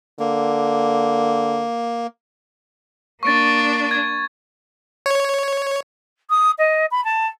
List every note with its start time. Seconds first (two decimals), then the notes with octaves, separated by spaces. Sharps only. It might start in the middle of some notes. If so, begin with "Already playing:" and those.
0.20 D3 A#3
3.23 A#3 D4 C#6 A6
3.91 G#6
5.06 C#5
6.30 D#6
6.58 D#5
6.91 B5
7.04 A5